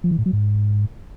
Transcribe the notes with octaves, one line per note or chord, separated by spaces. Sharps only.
F3
E3
A2
F#3
G#2